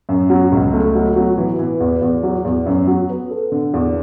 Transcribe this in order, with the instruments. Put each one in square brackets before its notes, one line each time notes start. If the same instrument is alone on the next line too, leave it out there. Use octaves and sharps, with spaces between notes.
[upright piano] F#2
F#3
C#2
A3
F#3
F#3
E3
E3
E2
E2
F#3
E2
F#2
F#3
B3
A4
D3
E2